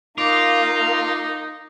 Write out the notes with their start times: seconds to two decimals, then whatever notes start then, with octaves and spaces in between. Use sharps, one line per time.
0.18 A#3 D#4 F4 D6